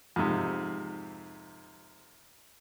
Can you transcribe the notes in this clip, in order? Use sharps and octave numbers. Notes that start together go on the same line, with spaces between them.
F2 G#2 C3